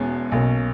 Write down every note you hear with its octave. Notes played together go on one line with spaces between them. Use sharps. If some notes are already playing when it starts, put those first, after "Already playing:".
Already playing: E1 E2 B2 G#3 C#4
B1 B2 A#3 C#4